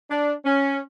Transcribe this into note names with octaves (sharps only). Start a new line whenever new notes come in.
D4
C#4